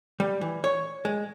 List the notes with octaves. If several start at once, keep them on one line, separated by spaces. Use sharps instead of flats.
G3
E3
C#5
G#3